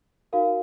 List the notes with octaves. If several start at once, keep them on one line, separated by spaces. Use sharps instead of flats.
D#4 F#4 A#4 F5